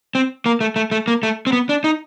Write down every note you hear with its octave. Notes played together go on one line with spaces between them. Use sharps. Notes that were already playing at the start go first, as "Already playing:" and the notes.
C4
A#3
A3
A3
A3
A#3
A3
C4
B3
D4
D#4